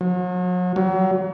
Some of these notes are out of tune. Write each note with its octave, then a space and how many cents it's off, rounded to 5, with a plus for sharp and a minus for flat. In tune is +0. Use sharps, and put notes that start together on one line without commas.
F#3 -40
F#3 +35